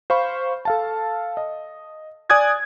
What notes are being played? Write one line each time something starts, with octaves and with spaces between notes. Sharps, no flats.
C5 F5 B5 C#6
A4 F5 A5
D#5
D5 G#5 D#6 F#6 G#6 A6